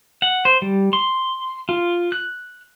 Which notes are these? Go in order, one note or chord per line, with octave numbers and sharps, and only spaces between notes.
F#5
C5
G3
C6
F4
F#6